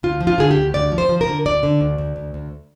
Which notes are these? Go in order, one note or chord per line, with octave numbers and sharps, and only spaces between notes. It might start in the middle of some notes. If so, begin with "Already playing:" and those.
D2 F4
F3
F4
D3 G#4
G4
D2
D2 D5
F3
C5
F3
A#4
D3
D2 D5
D3
D2
D2
D2
D2